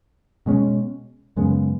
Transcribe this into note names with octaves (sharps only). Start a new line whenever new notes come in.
B2 G#3 C#4
F#2 C#3 G#3 B3